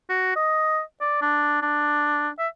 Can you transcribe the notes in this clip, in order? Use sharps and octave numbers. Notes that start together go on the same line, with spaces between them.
F#4
D#5
D5
D4
D4
E5